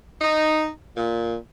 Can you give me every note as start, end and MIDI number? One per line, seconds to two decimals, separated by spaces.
0.21 0.67 63
0.97 1.36 46